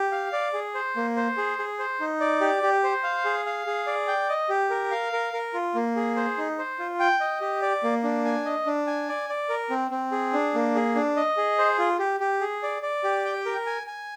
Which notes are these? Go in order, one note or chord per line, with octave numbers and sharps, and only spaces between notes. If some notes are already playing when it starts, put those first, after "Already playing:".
Already playing: G4
F5
D5
G#4
C5
A#3
C5
G#4
G#4
C5
D#4
D5
G4
G4
C5
F5
G#4
F5
G#4
D5
G5
D#5
G4
A#4
F5
A#4
A#4
F4
A#3
G#4
C5
D#4
C5
F4
G5
D#5
G4
D5
A#3
D4
G#5
D#5
D4
G#5
D5
D5
A#4
C4
C4
G#4
D4
A#3
G#4
D4
D#5
G#4
C5
F4
G4
G4
G#4
D5
D5
G4
G5
A#4
G#5
G#5